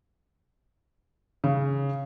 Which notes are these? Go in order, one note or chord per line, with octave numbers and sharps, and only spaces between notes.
C#3